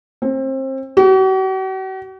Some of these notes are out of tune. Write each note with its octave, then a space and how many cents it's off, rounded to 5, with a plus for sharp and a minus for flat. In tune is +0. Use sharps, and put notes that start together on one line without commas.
C4 +30
F#4 +45